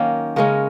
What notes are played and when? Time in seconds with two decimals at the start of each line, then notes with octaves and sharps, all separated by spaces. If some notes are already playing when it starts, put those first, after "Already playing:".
Already playing: D#3 F#3 A#3 C#4
0.36 C#3 G#3 C#4 A#4